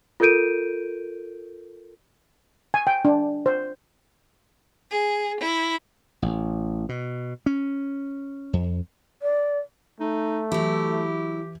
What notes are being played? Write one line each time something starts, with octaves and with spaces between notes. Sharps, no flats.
F4 A4 A#4 G6 D7 D#7
G#5
G5
D4
C5
G#4
E4
A1
B2
C#4
F2
D5
A3 D#4
E3 F#3 E4 G4